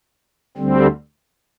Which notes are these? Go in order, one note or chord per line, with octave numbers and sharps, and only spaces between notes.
D2 D3 G3 C4